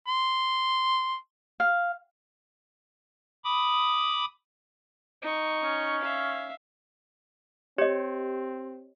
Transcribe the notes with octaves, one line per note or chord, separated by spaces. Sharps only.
C6
F5
B5 D6 D#6
D#4 C#6
C#4
E5 F5
C4 G4 C#5 D#5